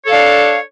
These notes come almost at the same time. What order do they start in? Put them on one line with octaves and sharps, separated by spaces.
C#5 A4 F5 D4